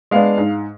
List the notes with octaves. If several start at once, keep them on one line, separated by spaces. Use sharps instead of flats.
G#3 B3 D4 F5
G#2